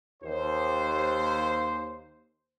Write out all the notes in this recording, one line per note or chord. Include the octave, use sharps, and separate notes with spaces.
D#2 C5